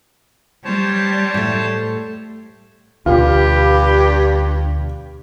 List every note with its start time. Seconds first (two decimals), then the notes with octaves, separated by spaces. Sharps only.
0.65 G3 C5 C#5 A5
1.34 A2 A3
3.06 D2 G2 B2 F4 G4 B4